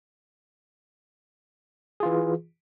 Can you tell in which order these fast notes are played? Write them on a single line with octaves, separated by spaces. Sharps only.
G#4 F4 E3